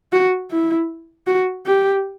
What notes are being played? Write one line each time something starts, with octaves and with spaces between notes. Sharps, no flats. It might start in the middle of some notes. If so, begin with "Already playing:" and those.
F#4
E4
F#4
G4